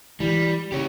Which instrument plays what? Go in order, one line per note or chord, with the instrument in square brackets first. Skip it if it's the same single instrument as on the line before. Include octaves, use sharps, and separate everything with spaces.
[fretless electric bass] E3 [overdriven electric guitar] G3
[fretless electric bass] C#3 [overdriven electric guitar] G4 C#5